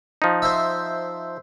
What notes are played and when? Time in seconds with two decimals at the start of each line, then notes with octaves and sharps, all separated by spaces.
0.22 F3 D#4
0.42 C5 E5